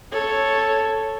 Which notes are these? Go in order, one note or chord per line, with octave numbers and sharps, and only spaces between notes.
A4 C#5